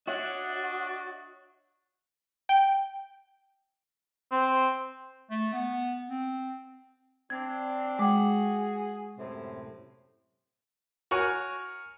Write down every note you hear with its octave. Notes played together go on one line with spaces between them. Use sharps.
D4 F#4 C#5 D#5 E5
G5
C4
A3
B3
C4
C4 D4 G#6
G#3 F#4 G#4 G5 D6
F#2 A2 C3
F#4 A#4 C#5 G#5